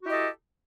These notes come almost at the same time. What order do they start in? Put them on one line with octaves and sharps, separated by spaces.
F#4 E4 G4 D#5 A4